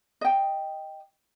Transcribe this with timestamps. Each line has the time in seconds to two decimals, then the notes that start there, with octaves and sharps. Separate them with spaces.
0.21 D#5 G5